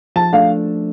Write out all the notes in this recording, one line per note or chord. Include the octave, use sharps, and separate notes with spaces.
F3 A5
A3 D4 F5